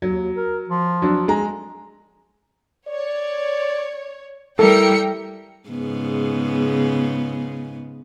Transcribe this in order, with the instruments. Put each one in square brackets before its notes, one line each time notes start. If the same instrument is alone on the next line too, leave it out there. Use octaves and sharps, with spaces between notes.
[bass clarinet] D#2 [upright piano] F#3
[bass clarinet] A#4
F3
[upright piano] F#3 D4
G#3 A#5
[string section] C#5 [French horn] D5
[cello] G3 [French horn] E4 [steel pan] A4 [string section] A#4 G5 C#7
[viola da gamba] G#2 C#3 B3